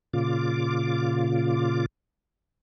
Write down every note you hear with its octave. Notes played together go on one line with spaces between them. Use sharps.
A#2 C#3 F4 D6